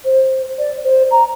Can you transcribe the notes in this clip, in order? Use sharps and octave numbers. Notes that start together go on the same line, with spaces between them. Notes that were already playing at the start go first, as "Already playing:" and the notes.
C5
D5
C5
A#5